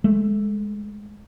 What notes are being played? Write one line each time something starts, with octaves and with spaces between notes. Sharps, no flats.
G#3 A3